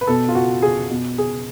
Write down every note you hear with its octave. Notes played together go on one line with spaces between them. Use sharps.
B4
B2 A4
F4
F#4
G#4
B2
G#4